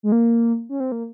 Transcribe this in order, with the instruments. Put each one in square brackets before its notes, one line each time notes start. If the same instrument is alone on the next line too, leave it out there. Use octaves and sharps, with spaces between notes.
[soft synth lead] G#3
A#3
C#4
C4
A#3